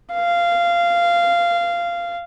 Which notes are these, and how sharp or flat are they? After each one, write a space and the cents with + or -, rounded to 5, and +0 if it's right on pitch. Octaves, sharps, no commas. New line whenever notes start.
F5 -15